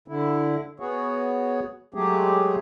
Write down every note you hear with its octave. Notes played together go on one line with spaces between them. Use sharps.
D3 E4
B3 F#4 G#4 C#5
F#3 G#3 A3 G4 G#4